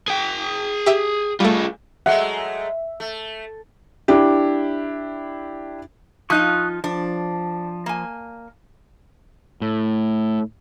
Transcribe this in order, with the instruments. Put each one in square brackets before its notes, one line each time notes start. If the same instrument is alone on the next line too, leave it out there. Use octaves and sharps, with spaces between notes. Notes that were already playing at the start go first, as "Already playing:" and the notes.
[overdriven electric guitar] G#4 G5
[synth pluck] G4 E5 D#7
[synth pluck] G3 A3 [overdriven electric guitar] F4 G#4
[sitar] F#3 G#3 A3 [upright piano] E5 [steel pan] F#5
[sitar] A3
[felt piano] D4 E4 G4
[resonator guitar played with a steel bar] F3 D#4 F4 [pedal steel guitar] C#6 D#6 F#6
[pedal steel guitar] F3 [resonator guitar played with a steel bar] D4
[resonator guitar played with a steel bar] A#3 G#5
[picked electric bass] A2